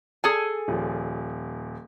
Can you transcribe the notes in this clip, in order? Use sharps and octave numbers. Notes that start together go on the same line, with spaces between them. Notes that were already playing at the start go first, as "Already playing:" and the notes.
G#4 A4 G#5
D#1 F3